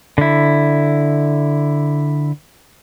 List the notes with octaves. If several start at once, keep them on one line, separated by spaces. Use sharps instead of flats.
D3 E4